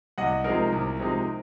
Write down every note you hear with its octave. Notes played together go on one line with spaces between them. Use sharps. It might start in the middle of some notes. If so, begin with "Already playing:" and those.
C2 D#5 F#5
C3 F3 G#3 D#4 A#4
C2
C3 F3 G#3 D#4